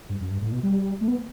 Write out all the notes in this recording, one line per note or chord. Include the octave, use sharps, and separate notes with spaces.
G2
F#2
G2
A2
B2
G3
A3
B3